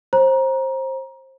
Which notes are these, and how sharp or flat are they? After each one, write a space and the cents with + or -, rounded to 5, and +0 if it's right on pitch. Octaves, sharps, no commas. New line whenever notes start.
C5 +25 A#5 +25